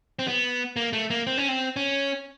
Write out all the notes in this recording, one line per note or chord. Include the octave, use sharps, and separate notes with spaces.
C4
B3
A#3
A3
A#3
C4
C#4
C4
C#4